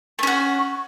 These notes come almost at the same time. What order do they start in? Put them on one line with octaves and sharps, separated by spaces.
A3 C#4 F#4